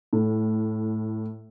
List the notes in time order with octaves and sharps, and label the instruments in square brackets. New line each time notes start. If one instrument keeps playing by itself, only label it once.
[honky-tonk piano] A2